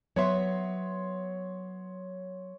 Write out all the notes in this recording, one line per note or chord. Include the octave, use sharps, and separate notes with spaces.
F#3 B3 C#5 E5 C6